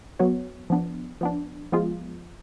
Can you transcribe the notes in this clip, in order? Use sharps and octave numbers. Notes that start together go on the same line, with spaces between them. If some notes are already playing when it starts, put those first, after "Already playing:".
F#3 B3 F#4 C#5
F3 B3 D4
F3 B3 D4
F3 G#3 B3 F4 G#4